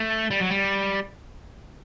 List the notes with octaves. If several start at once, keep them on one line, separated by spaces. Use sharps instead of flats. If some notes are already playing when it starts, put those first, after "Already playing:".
Already playing: A3
G3
F#3
G3